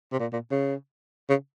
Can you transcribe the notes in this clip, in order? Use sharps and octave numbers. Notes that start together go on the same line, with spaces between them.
C3
A#2
A#2
C#3
C#3